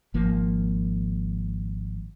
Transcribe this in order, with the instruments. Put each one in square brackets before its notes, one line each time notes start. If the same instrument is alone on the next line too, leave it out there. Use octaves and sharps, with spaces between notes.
[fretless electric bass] G#1 F3 A#3